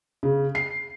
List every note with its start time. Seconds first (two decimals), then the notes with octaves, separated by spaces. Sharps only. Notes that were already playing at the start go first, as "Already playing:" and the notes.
0.23 C#3
0.55 C7